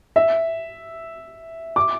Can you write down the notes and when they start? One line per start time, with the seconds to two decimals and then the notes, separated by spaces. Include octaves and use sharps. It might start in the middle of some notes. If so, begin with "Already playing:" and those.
0.16 E5
1.76 D6